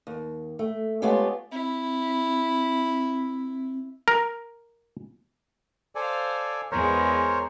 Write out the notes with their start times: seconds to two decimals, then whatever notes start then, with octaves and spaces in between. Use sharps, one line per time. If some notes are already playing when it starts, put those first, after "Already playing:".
0.07 D#2
0.59 A3
1.02 G#3 A3 B3 F4 G4 C#5
1.52 C4 E4
4.08 A#4
5.95 A4 C5 D5 F5 G#5
6.72 E2 G#3 B3 A#4 C5 C#5